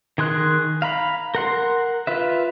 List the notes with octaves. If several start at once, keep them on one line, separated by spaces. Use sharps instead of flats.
D#3 G#4 C6 F#6
F5 A#5 B5
A#4 F#5 C6
F4 B4 E5